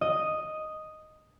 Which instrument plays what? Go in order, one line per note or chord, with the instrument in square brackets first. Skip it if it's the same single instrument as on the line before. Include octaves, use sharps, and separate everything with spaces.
[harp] D#5